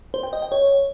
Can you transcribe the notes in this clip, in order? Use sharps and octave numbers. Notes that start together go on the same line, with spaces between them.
C5
G5
D#5
G5
C#5